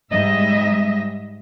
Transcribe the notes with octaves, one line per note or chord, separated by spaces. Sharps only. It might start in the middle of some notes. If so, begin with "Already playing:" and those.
G#2 G3 D#5 E5